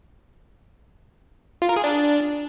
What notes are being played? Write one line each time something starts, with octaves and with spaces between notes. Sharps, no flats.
F4
A#4
G#4
D4